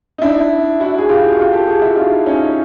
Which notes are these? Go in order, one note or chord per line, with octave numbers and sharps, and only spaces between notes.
D#4
D4 E4
E4 F#4
G#4
F4 G4
F#4
F4 G4
G4 A4
F#4 G#4
E4 F#4
D#4 F4
C#4 D#4